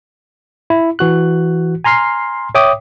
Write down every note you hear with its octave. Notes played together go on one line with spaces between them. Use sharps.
E4
E3 F#4 F#6
G#5 A#5 C6 F6 C7
C#5 E5 G5 D6 D#6